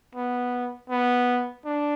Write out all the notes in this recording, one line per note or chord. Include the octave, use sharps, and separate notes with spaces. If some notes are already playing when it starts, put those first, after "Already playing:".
B3
B3
D4